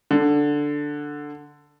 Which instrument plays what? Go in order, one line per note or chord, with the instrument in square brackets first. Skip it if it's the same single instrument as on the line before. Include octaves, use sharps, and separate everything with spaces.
[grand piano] D3